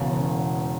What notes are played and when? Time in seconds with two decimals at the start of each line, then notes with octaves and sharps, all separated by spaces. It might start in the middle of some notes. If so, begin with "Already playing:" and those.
Already playing: E1 E2 C#3